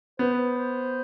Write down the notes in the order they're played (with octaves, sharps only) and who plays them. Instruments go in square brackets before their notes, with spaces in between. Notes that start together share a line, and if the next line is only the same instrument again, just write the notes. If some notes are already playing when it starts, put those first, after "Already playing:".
[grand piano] B3 [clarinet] C5
[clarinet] B4
C5
C5